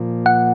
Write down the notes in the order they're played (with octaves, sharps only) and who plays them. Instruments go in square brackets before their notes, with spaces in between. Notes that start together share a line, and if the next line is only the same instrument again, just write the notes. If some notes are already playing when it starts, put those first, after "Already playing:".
Already playing: [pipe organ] A#2 F3 A#3
[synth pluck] F#5